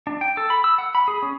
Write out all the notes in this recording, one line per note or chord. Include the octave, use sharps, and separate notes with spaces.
D4
G5
A4
B5
E6
F#5
B5
G#4
C#4